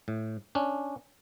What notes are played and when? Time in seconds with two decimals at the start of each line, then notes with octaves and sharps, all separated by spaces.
0.08 A2
0.55 C#4 D4